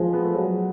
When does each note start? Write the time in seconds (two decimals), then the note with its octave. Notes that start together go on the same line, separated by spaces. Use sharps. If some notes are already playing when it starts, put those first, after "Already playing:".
Already playing: F3 G#3
0.13 B3
0.24 A3
0.35 F#3 G#3